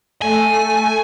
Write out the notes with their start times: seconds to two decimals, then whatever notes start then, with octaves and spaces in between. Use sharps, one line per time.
0.22 A3 A4 G#5